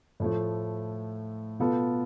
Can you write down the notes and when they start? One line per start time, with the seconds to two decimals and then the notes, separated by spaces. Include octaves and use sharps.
0.20 A2 F3 A3
1.60 B2 B3 F4 A4